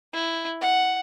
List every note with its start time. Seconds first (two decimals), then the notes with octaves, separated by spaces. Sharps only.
0.13 E4
0.61 F#5